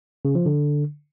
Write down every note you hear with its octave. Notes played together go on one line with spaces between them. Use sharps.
C#3
F3
D3